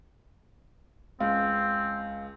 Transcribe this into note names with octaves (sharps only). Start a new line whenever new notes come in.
C#2 C4 F5